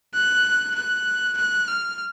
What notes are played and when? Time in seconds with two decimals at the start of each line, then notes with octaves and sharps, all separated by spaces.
0.14 F#6
0.75 F#6
1.37 F#6
1.68 F6